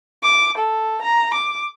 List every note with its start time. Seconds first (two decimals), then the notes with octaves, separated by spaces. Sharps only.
0.23 D6
0.58 A4
1.02 A#5
1.34 D6